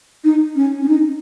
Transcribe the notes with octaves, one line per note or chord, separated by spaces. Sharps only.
D#4
C#4
C#4
D#4